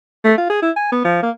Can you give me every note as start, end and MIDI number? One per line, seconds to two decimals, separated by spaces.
0.24 0.33 57
0.38 0.48 65
0.50 0.58 68
0.62 0.71 64
0.76 0.91 80
0.92 1.02 59
1.05 1.18 53
1.23 1.31 58